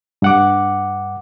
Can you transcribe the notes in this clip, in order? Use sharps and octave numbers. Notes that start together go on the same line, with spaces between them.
G2 F#5 D6